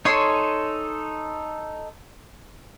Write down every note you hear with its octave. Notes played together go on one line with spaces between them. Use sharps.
D#4 A4 C#5 G#5 C6